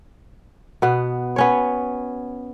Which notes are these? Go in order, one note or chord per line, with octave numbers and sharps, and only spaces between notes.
B2 B3
B3 C#4 C#5